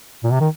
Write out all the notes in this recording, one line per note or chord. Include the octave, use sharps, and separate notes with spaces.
A#2
C3
D#3